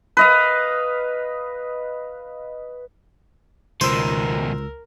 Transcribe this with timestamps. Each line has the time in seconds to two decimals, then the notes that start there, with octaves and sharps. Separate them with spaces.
0.17 B4 D#5 F5
3.81 C#2 B2 D#3 A#4 C5 E6